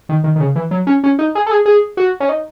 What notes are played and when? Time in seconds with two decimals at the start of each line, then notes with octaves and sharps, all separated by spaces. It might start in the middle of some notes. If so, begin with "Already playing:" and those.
0.09 D#3
0.24 D#3
0.36 D#3
0.40 C#3
0.56 E3
0.71 F#3
0.87 C#4
1.04 C#4
1.19 D#4
1.35 G#4
1.47 A4
1.51 G#4
1.66 G#4
1.97 F#4
2.20 C#4
2.29 D#4